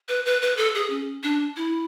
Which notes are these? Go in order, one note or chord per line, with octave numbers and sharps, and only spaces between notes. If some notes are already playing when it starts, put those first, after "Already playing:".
B4
B4
B4
A4
G#4
C#4
D4
E4